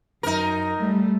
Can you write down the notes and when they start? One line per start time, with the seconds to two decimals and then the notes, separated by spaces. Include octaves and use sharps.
0.23 F#2 D#4 A#4
0.79 G3 A3